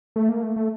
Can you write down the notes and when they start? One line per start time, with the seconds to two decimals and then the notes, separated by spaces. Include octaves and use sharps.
0.16 A3
0.29 A#3
0.43 A3
0.56 A3